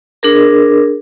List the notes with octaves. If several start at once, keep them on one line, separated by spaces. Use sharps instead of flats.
D4 G#4 A#4